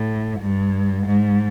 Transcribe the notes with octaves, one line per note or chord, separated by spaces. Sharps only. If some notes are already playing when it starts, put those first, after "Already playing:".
Already playing: A2
G2
G#2